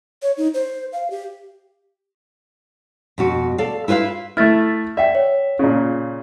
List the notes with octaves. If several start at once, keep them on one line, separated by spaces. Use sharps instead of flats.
C#5
D#4
C5
F5
G4
F2 B2 F#4
A4 D5 F5
E4 F4 B4 E5 F5
A3 E4 F6 A6
D5 E5 F#5 G5
C#5
A#2 C#3